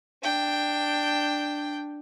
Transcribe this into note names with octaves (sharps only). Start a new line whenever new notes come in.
D4 G5